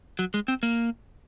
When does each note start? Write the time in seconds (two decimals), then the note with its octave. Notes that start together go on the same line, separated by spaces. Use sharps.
0.19 F#3
0.34 G#3
0.48 C4
0.63 A#3